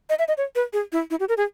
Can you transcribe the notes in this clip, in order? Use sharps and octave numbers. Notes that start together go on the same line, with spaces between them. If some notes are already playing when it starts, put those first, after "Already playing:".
D#5
E5
D#5
C#5
B4
G#4
E4
E4
G4
A#4
G#4